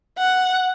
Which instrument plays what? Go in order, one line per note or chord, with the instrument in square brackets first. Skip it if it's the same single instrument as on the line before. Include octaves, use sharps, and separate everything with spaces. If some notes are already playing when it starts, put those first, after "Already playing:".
[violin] F#5